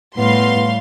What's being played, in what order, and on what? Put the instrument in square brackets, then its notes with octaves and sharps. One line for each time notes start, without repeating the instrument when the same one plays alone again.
[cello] A2 [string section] G3 F5 C6 [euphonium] B3